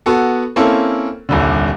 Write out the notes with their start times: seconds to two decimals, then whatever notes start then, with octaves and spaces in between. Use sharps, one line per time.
0.06 B3 F#4 A4
0.56 A#3 C4 C#4 E4 A4
1.29 D#1 C2 D3